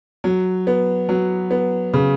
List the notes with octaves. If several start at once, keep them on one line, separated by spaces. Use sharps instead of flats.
F#3
B3
F#3
B3
C#3